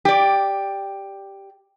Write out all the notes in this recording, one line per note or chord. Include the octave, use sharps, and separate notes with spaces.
G4 D5